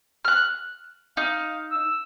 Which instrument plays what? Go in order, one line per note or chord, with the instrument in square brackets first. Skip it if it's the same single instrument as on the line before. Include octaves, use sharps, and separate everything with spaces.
[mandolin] F6 F#6
[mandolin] D#4 [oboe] F5
[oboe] E6